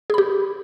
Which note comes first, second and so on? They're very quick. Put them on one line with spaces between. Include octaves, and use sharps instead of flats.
G#4 B5 G4